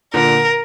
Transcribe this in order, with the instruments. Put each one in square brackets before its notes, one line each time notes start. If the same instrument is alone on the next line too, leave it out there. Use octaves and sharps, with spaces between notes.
[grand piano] A#2 D3 [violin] A#4